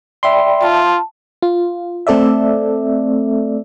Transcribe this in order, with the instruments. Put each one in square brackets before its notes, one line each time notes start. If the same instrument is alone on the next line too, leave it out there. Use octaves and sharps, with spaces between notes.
[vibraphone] D5 G5 B5 [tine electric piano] E5 C6
[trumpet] F4 [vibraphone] A5
[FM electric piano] F4
A3 C4 A4 D5 E5